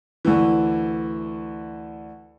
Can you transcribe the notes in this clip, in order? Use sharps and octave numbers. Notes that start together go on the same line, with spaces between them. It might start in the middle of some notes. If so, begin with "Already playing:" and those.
D2 E3